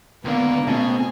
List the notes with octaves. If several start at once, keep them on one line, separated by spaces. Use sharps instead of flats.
C#2 D3 A#3 B3 B4
B2 A3 C4 C#4 F4 G#4